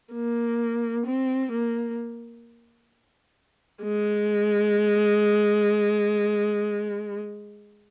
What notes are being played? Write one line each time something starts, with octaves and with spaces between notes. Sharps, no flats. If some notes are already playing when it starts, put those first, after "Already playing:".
A#3
C4
A#3
G#3